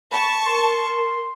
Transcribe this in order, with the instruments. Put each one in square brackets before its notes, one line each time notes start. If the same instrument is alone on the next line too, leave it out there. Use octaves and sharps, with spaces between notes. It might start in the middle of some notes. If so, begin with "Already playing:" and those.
[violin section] A5 C#6 [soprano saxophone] B5
[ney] A#4 [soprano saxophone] C6